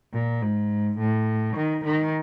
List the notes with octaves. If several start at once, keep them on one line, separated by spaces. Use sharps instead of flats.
A#2
G#2
A2
D#3
D#3